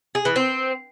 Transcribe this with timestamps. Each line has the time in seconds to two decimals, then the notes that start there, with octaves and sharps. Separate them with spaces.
0.15 G#4
0.25 E3
0.36 C4